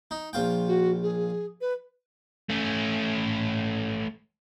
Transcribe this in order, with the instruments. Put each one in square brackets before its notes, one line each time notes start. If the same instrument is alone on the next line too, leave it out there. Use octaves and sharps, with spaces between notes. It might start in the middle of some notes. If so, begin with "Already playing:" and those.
[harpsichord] D#4
A#1 F4 G5
[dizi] F#4
G#4
B4
[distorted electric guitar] A3 C#4